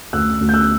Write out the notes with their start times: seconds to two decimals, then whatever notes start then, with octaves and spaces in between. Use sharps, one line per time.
0.13 D2 E6 F#6
0.40 D2
0.49 G6
0.54 E6 F#6